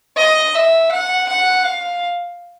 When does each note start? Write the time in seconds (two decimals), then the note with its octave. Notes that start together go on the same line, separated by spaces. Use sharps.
0.16 D#5
0.54 E5
0.91 F#5
1.28 F#5
1.65 F5